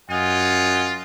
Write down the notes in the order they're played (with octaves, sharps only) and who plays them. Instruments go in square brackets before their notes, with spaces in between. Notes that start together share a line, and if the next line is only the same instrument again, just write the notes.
[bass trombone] F#2 [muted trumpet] F4 [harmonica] D#5 F#5 G#5